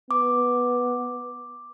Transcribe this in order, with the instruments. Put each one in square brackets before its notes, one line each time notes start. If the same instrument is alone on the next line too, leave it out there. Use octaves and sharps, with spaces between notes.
[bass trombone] B3 [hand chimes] D6